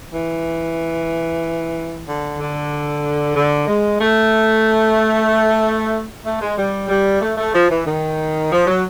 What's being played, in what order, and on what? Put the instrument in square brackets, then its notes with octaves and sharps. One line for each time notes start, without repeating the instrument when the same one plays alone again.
[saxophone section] E3
D3
D3
D3
G#3
A3
A3
G#3
G3
G3
A3
A3
F3
E3
D#3
F3
F#3